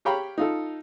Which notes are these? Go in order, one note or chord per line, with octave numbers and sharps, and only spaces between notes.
G4 C#5 F5 G5 A#5 B5
D#4 F4 A4